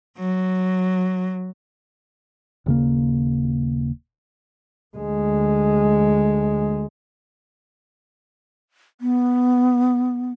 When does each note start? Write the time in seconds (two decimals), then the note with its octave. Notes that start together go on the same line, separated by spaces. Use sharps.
0.18 F#3
2.66 D#1 C#3 A#3
4.97 D2 G#3
9.01 B3